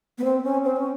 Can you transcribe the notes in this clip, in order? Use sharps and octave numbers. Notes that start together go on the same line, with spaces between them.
B3
C4
C#4
C4
C#4